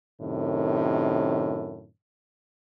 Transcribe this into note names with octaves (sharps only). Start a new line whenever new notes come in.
F#2 A2 C3 D#3